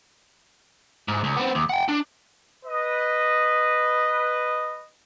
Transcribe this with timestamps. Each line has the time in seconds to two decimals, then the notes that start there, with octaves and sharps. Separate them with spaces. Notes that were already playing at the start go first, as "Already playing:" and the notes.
1.08 G#2
1.24 C#2
1.37 B3 C4
1.55 D#2
1.69 F#5 G5
1.88 D4
2.65 B4 D#5